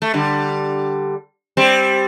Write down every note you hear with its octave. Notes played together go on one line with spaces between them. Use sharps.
A3
D3 G3
G3 C4